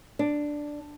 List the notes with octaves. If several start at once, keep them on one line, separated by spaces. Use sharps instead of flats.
D4